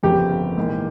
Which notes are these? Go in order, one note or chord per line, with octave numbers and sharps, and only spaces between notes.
G1 F2 C#3 F3 A#3 G4
A#1 G#2 E3 A#3